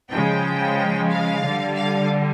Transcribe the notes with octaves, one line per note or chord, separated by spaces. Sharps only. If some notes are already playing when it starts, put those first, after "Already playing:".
C#3 F3 G#3 G5
F5
D3 G3
F5